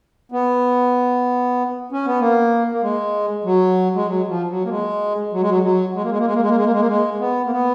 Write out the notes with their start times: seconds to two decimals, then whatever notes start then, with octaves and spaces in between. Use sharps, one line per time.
0.32 B3
1.92 C#4
2.06 B3
2.19 A#3
2.72 A#3
2.82 G#3
3.44 F#3
3.95 G#3
4.07 F#3
4.28 F3
4.49 F#3
4.65 A#3
4.69 G#3
5.32 F#3
5.41 G#3
5.49 F#3
5.63 F#3
5.95 G#3
6.02 A#3
6.10 G#3
6.18 A#3
6.26 G#3
6.33 A#3
6.42 G#3
6.48 A#3
6.57 G#3
6.64 A#3
6.73 G#3
6.80 A#3
6.87 G#3
7.20 B3
7.46 A#3
7.51 B3